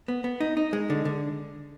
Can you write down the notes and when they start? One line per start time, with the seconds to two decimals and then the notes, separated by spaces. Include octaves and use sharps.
0.08 B3
0.24 B3
0.40 D#4
0.57 D#4
0.73 G#3
0.90 D3
1.05 D3